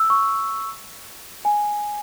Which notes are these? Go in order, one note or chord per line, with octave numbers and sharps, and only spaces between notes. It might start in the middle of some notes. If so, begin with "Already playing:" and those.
Already playing: E6
C#6
G#5